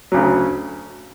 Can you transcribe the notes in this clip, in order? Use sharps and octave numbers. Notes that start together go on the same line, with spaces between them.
D2 C#3 F#3